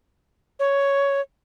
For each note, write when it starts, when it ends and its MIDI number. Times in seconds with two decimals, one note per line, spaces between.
0.59 1.21 73